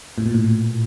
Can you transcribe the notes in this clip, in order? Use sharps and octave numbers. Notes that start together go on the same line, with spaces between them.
A2
A#2
A2